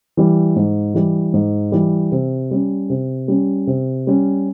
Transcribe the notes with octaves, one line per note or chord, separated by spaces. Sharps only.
E3 G3
G#2
E3 G3
G#2
E3 G3
C3
G3 C#4
C3
G3 C#4
C3
G3 C#4